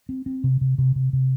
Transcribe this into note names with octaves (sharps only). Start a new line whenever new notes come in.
C4
C4
C3
C3
C3
C3
C3